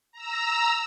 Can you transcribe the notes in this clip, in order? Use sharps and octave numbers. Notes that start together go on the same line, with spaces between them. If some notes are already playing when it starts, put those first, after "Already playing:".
A#5 E6